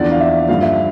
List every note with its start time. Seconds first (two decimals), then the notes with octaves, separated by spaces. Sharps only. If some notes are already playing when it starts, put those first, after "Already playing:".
Already playing: E2 D3 F3 D5
0.11 F5
0.20 E5
0.48 G2 D3 F3 F5
0.63 E5